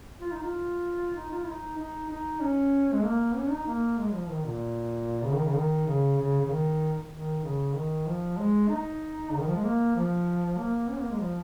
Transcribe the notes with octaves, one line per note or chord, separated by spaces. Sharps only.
F4
D#4
F4
D#4
F4
D#4
D#4
D#4
C#4
G#3
A#3
C#4
D#4
A#3
G#3
F3
D#3
A#2
C#3
D#3
C#3
D#3
C#3
C#3
C#3
D#3
D#3
C#3
D#3
F3
G#3
D#4
C#3
D#3
F3
G#3
A#3
F3
A#3
C#4
A#3
G#3
F3